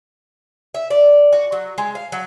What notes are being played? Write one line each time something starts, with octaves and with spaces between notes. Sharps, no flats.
E5
D5
F#4
F#3
G#3
F5
F#3